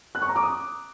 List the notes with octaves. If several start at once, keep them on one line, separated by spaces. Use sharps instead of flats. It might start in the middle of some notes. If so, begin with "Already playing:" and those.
F#6
C#6
A#5
D6
D#6